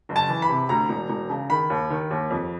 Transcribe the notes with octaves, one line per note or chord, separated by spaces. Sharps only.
F#1
A5
E3
B5
C3
D2 A#5
E1
E1
C#3
D#3 B5
D#2
D#3
D#2
F2